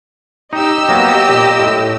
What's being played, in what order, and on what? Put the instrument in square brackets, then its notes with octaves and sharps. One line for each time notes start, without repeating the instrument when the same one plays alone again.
[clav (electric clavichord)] D#4 [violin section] G4 D#5 E6
[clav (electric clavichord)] F#3 A#3 B3
A#2
A2